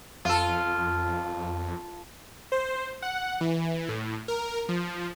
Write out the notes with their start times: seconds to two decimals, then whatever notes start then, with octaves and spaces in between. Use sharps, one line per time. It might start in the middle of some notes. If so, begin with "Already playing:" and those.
0.25 F2 F4 A4
2.52 C5
3.02 F#5
3.41 E3
3.89 A2
4.28 A#4
4.69 F3